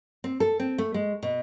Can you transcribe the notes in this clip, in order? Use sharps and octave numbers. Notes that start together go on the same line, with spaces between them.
C4
A4
C4
A3
G#3
B2